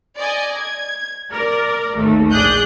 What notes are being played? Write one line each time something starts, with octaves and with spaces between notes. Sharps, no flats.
D5 D#5 G#5
G#6
A#4 D5 D6
G#1 D#2 A3
A#1 G#4 D5 D#6 F#6 G6